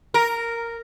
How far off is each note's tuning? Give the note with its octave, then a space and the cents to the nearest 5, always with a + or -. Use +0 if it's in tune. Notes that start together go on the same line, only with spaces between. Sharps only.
A#4 -5